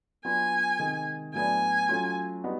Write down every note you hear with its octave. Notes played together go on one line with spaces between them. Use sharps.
F#3 B3 D4 F4 G#5
C3 D#3 G#3
A2 F#3 B3 D4 G#5
F#3 A3 C#4 F4
G3 B3 D#4 F#4